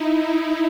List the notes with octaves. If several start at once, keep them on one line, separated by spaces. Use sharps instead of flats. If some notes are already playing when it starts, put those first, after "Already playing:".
Already playing: D#4 E4
E4